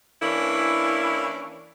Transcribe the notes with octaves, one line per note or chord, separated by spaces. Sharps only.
E3 A#3 C#4 D4 E4